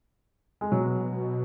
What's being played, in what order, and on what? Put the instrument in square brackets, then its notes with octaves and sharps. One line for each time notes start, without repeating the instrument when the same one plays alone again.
[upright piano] G#3
[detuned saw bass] B2 [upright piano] F#3